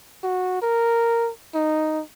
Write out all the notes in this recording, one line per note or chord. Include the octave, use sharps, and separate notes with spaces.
F#4
A#4
D#4